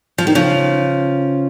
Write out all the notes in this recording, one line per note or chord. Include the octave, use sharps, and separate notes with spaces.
F3
D#3
C#3 F3